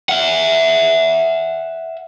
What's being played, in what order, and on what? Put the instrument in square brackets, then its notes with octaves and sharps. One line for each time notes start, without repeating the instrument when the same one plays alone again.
[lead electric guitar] E5 F#5